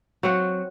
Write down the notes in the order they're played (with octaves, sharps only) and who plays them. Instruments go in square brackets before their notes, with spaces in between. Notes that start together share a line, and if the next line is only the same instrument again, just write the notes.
[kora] F#3 C4 F#4